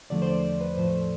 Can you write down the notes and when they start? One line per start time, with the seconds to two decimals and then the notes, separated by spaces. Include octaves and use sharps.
0.10 E2 D3 F3 A3 D5
0.22 C5
0.27 D5
0.43 C5
0.61 B4
0.77 A2 F3 A3 C5